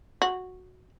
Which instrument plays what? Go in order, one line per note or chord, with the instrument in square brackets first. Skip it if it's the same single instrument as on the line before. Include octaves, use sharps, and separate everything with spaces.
[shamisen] F#4